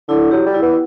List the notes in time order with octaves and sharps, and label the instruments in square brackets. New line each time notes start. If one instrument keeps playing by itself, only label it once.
[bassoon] D3 [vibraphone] E4
[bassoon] F#3 [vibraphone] G4
[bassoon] G3
[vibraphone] E4
[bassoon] B3